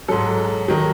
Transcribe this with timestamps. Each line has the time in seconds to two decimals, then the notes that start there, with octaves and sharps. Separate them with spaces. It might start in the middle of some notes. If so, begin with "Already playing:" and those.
0.08 G#2 F#3 A4
0.68 D#3 F#3